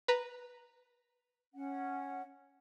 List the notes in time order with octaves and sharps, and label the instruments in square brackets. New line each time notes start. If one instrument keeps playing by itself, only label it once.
[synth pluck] B4 A#5
[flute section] C#4 F#5